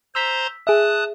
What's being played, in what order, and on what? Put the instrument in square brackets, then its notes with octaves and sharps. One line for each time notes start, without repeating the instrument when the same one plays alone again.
[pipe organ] C5 A#5 C6 [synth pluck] E6 B6
[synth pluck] G#4 E5 [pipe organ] A5 D#6 F#6